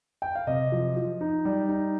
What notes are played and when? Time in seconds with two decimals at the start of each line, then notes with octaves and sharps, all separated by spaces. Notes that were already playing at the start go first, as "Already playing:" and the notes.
0.22 G5
0.35 F5
0.47 C3 D#5
0.72 F3
0.97 F3
1.21 D#4
1.45 G3
1.69 D#4